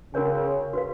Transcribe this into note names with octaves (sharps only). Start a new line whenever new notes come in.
C#3 C#4 F#4 A#4 C#5 G#5
F#4 B4 F5